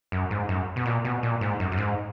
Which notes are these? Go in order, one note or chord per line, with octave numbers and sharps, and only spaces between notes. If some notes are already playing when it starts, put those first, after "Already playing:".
F#2
G#2
F#2
B2
A#2
B2
A#2
G#2
F#2
F#2
G#2